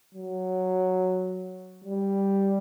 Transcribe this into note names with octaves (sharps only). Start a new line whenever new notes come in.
F#3
G3